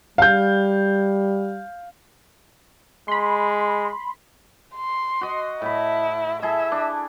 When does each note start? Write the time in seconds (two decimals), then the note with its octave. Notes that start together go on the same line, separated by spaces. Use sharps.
0.18 G3 F5 G6
3.08 G#3 B5 C6
4.76 C6
5.21 F#4 D#5
5.62 A2 E4 B5
6.42 E4 G#4 A4 E5
6.72 D4 D6